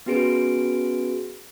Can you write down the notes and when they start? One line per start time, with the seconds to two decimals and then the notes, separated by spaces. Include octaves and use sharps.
0.06 B3 C#4 F#4 G#4 B4 D7